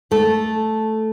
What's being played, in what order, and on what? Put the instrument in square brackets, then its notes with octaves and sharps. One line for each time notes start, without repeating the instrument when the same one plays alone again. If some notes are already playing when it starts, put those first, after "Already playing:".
[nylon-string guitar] D#2 A3 A4